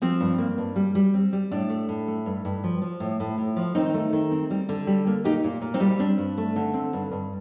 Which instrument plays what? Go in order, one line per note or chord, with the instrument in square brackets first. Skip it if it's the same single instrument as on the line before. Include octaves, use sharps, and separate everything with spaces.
[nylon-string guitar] F3 C4
G2
A#3
G2
G3
G3
C4
G3
A2 D4
A3
A2
A3
G2
G2
F3
F3
A2
A2
A2
F3
D#3 C4 D#4
A3
D#3
C4
G3
D3
G3
A#3
A#2 D#4 G4
A#2
A#2
C4 D#4
G3
C4 D4
G2
A3
D3
C4
G2
G2